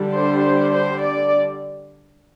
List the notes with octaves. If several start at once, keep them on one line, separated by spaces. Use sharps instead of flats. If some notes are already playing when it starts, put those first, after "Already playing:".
Already playing: D3 G3 D4
C5
C5
D5